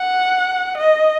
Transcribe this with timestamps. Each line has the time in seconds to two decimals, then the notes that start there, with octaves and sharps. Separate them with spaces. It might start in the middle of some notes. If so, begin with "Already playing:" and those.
Already playing: F#5
0.78 D#5